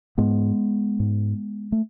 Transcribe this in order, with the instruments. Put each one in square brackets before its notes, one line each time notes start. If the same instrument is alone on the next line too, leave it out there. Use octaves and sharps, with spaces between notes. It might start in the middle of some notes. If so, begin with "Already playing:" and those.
[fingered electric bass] G#2 G#3 B3
G#2
A3